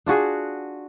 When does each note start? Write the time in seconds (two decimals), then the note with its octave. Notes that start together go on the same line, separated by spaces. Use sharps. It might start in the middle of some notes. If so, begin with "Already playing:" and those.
0.06 D4 F4 F#4 G#4